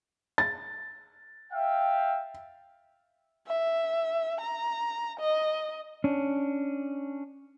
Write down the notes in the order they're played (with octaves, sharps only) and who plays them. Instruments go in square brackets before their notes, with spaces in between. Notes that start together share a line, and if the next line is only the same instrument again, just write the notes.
[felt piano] A6
[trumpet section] E5 F5 G5
[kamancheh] E5
A#5
D#5
[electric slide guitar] C#4 D4